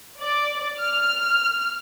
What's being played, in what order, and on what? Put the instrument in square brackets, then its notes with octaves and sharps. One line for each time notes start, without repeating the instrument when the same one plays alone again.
[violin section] D5
F6